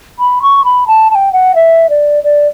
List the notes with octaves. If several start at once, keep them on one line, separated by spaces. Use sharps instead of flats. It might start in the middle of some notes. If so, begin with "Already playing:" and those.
B5
C#6
B5
A5
A5
G5
F#5
E5
D5
D5